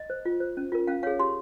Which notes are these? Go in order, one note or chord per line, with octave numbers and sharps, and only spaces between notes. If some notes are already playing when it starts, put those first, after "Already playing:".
Already playing: D#5
C5
F4
C5
C#4
F4 A#4
C#4 F5
G#4 C#5 F5
G4 C6